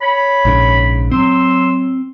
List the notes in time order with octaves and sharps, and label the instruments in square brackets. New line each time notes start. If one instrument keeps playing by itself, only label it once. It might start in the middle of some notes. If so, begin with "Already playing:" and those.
[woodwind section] C#5 B5
[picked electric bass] A#1 G#2 C#3
[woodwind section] F#3 C6 E6 [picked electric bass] C4